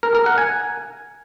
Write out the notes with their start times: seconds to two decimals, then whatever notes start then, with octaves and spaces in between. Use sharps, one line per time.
0.03 A#4
0.15 A#4
0.26 F#5
0.38 G#5